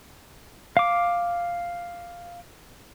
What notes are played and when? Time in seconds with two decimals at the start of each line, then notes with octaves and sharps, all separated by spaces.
0.77 F5 D6